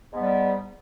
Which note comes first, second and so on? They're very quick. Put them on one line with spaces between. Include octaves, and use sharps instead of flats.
G#2 B3 G3